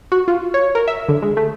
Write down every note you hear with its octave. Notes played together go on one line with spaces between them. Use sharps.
F#4
F4
C#5
A#4
E5
D3
G#3
A3